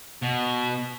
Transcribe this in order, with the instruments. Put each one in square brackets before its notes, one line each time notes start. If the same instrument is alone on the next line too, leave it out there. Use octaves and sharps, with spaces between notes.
[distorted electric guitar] B2